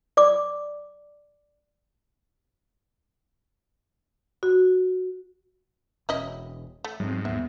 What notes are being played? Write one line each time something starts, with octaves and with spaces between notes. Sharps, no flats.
D5 D6
F#4
E1 C#4 E4 D#5
A3
G#2 F#3 G3 C4
A#1 D#2 B3 E5